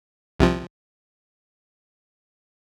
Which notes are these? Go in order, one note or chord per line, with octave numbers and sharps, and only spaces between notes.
C2 C3 F3